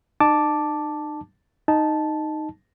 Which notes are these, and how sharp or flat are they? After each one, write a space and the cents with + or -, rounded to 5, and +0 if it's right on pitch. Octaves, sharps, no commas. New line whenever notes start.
D#4 -40 A5 +0 D6 +0
D#4 -5 A5 -10